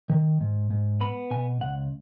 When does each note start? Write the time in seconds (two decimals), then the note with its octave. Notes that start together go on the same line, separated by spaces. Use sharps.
0.10 D#3
0.41 G#2
0.70 G#2
1.01 B3 B5
1.31 B2 G#5
1.60 C#2 F#5